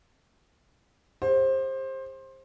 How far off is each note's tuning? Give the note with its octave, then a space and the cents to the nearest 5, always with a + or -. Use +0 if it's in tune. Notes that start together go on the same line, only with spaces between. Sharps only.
G4 +45 C5 +20